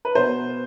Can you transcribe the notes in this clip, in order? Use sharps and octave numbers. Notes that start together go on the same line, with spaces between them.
B4
B2 C5